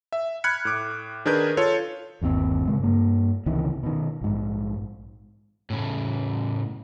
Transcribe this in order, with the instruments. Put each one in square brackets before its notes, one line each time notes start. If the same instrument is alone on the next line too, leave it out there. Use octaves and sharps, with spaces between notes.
[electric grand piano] E5
B5 F6 F#6 G#6 C#7
A2 D6
D#3 D4 G#4 A#4 B4 G6
F4 A4 C#5
[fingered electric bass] G1 D#2 A#2 C4
A#2 C#3 G#3
G2 A#3
C#2 C3 D#3 E3
B2 D#3
A#1 G#2
[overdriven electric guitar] A2 C#3